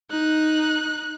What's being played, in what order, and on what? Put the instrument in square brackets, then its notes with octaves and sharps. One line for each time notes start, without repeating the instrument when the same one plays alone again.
[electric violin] D#4 F#6